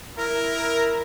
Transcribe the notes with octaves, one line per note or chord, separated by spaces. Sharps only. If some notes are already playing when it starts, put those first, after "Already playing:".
E4 A#4